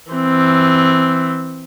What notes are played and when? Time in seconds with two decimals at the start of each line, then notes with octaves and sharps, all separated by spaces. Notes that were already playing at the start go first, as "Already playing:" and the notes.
0.11 E3 C4